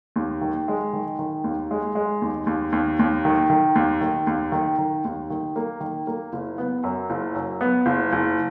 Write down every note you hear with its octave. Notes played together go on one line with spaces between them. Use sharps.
D#2
D#3
G#3
D#3
D#3
D#2
G#3
G#3
D#2
D#2
D#2
D#2
D#3
D#3
D#2
D#3
D#2
D#3
D#3
D#2
D#3
A#3
D#3
A#3
F#1
B3
F#2
F#1
F#2
B3
F#1
F#1